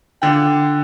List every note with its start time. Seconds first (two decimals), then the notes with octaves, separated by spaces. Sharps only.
0.22 D3 F4 D5 G5